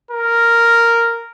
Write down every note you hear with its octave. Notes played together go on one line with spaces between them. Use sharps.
A#4